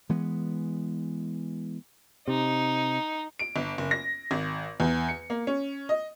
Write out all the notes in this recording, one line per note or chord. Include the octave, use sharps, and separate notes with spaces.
E3 G#3 B3
C3 D#4
D7
G1
F#1
A#6
G#1
E2
C#7
A#3
C#4
D#5